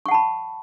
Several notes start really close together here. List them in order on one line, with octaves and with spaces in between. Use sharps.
C#6 F#5 A5 B5